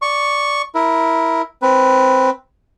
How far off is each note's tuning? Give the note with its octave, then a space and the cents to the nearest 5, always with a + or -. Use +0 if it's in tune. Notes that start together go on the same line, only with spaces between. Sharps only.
D5 -10 C#6 +0
E4 -5 A#4 +0
C4 +0 B4 +0